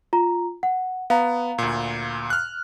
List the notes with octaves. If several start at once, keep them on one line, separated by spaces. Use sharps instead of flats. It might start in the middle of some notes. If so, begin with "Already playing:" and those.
F4 A#5
F#5
B3 F5 A#5
D2 A#2
F6 F#6